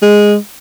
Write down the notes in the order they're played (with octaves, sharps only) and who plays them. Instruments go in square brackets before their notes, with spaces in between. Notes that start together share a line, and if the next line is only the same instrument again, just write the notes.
[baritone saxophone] G#3